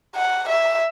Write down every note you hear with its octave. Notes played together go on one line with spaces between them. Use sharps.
F#5
E5